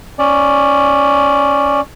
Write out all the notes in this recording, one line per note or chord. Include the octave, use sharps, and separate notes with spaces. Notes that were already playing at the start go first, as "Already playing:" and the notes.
C#4 D5